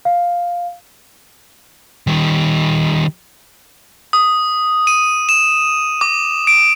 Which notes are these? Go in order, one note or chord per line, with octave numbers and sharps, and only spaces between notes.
F5
D#3 G3
D#6
D#7
E7
D6
D7